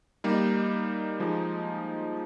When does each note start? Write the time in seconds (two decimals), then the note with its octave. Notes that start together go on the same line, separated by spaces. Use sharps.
0.24 G3 A#3 D#4
1.20 F3 G#3 D#4